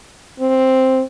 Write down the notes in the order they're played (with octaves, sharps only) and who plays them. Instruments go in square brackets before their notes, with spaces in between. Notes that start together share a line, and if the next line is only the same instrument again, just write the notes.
[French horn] C4